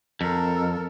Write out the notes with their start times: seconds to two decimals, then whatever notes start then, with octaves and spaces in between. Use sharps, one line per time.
0.21 F2 A4 A#4